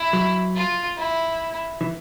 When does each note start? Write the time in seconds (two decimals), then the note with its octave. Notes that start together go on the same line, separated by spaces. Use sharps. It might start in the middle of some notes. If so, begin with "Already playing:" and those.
Already playing: E4
0.13 F#3
0.56 F4
0.97 E4
1.81 E3